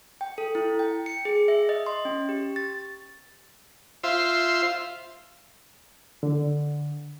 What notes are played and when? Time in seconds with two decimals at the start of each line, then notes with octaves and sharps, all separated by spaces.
0.21 G5
0.38 A4
0.55 E4
0.79 G5
1.06 C#7
1.25 G#4
1.48 E5
1.69 D#5
1.86 C6
2.05 C#4
2.29 G4
2.56 A6
4.04 F4 C5 E5
6.23 D3